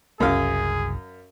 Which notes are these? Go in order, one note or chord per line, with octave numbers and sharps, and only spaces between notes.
F#1 C2 F#2 G#4 F5